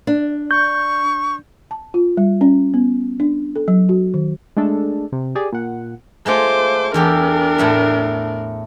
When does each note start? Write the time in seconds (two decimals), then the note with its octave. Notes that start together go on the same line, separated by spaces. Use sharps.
0.07 D4
0.51 C#6 G6
1.71 A5
1.94 F4
2.17 G3
2.41 C#4
2.74 B3
3.20 D4
3.56 A4
3.68 F#3
3.89 F#4
4.14 D#3
4.57 G#3 A3 D4 A4
5.12 C3
5.35 G4 G#4 D5
5.52 A#2 F#5
6.26 G#3 A3 F4 C5 D6
6.94 E2 D4 G4 A4 A#4
7.58 A2 A3 E5